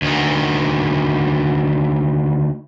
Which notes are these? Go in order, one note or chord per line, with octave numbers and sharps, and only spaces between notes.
D2 D#3